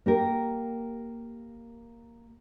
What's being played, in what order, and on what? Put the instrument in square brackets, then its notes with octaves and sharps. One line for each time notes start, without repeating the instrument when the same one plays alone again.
[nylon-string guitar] A#3 G4 A#4